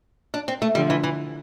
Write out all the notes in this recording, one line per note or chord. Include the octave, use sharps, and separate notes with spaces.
D4
C4
A3
D3 F3 G3
E3
E3